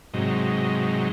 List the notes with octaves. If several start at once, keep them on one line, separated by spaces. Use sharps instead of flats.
G#2 C3 F#3 D#4